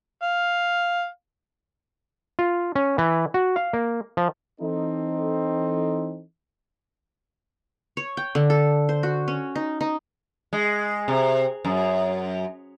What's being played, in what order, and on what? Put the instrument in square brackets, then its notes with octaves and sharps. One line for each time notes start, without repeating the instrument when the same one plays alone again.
[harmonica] F5
[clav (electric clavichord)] F4
C#4
E3
F#4
F5
A#3
F3
[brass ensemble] E3 C4 D#4 A4
[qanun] C#5
G5
D3
A4
C5
F#4
C#4
D#4
D#4
[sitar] G#3
C3
F#2